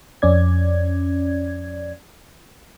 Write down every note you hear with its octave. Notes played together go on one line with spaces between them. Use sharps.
F2 C#4 D5 G#6